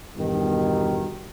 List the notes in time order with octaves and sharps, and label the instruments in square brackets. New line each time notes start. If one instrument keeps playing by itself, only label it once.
[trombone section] E2 G2 B2 D#3